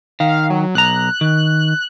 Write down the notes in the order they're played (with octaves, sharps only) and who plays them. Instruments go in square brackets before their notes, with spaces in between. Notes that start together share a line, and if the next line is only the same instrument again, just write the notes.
[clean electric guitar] D#3 [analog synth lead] F5
[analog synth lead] F#3
[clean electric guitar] B1 A#5 [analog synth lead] F#6
[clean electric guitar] D#3